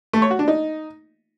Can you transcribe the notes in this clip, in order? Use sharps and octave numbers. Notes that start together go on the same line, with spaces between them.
A3
C#5
F#4
D4
D#4